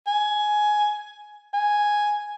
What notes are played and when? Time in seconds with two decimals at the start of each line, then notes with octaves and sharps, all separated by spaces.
0.07 G#5
1.54 G#5